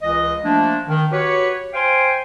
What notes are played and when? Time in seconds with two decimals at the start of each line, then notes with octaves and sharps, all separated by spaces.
0.02 C#2 E3 D#5
0.44 F3 A3 A#3 D4
0.88 D#3
1.12 F#4 G4 B4 C#5
1.74 C5 F5 G5 G#5 C6